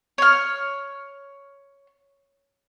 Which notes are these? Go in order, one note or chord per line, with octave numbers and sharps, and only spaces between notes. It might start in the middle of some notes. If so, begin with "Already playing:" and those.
C#5 F6